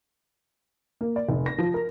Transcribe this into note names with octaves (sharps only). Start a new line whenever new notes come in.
A#3
D5
F1
A#6
F3
A#4